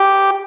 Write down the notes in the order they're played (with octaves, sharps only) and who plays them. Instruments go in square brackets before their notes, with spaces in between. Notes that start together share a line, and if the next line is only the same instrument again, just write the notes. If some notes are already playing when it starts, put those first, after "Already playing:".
Already playing: [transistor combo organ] G4